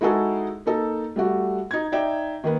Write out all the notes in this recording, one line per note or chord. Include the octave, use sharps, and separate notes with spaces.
G#3 D#4 E4 F#4 G#4 A4
A#3 D#4 A4
G3 A3 F#4
D#4 G#6
D#4 D5 E5 G5
D#3 A#3 B4